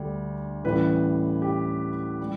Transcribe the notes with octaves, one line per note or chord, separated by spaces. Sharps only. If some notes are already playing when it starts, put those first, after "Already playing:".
Already playing: D2 D3 G3
A1 A2 E3 G3 B4
G4
G3